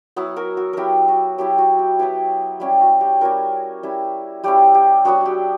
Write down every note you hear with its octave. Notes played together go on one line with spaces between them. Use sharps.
F#3 B3 E4
F#4 A#4
F#4
F#3 B3 E4 G4 A#4
F#4
F#3 B3 E4 G4
F#4
G4
F#3 B3 E4 G4 B4
G3 C#4 E4 G4
F#4
G4
G3 C#4 E4 F#4 A#4
G3 C#4 E4
G3 C#4 E4 G4
G4
F#3 B3 D4 F#4
G4